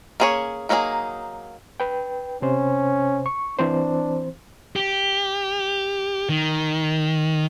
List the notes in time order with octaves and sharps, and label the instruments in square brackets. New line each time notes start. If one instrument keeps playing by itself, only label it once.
[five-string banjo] A#3 C#4 G#4 C5 C#5
F#3 A#3 D#4 E4 G#4
[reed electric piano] B4 G5
[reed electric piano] C3 C5 [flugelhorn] C#4
[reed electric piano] C#6
[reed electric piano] E3 C4 C5 [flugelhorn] D4
[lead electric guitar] G4
D#3